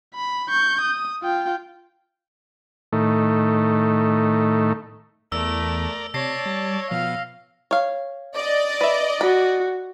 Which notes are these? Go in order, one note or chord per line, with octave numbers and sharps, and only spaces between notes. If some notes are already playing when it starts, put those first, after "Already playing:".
B5
C#6 G6
D#6
F4 G5
A2 D#3 A3
E2 A3 A#4 D5 E6
C3 C#5 D5 A5 A#6 C7
G3
B2 F3 F5
C#5 F5
D5 D#5
B4 E5
F#4 B5